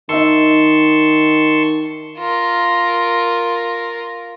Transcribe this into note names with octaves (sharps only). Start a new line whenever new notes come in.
D#3 D#4 E5 A5 C6 C#6 E6
F4 A#4